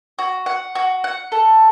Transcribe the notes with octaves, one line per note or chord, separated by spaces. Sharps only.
F#4
F#5
F#4
F#5
A4